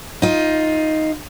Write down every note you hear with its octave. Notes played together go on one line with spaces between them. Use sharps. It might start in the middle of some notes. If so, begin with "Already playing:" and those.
D#4 F4